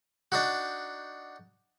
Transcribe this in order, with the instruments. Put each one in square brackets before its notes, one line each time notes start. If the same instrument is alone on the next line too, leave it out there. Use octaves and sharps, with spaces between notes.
[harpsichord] D4 D#4 F#4